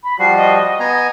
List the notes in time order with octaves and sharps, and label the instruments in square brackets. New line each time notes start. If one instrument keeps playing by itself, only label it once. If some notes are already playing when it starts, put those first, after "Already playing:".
[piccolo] B5
[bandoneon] F3 G3 F#4 [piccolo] C7
[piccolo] D#5
[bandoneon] B3 G#5 A#5